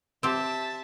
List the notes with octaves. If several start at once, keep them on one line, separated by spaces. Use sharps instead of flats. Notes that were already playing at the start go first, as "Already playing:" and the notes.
C4 G4 E5 A5